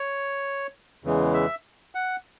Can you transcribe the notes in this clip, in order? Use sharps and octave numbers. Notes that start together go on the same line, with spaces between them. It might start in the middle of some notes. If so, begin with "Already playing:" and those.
Already playing: C#5
E2 C#3 E3 G#3
E5
F#5